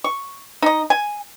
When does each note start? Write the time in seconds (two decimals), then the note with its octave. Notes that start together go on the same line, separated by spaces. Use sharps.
0.04 C#6
0.62 D#4 D#5
0.90 G#5